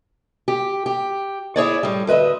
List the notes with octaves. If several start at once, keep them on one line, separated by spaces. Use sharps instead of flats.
G4
G4
E4 G#4 C#5 D5
A2 G3
D2 B4 D#5 E5